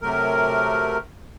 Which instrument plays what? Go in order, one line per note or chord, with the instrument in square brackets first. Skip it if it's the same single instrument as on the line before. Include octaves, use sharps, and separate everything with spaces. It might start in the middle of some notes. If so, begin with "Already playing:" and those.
[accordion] C3 F#3 A3 A#4